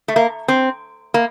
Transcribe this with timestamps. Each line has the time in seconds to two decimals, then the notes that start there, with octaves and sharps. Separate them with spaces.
0.08 A3
0.16 A#3
0.48 C4
1.14 A#3